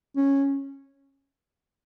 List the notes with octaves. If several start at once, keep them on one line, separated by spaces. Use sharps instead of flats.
C#4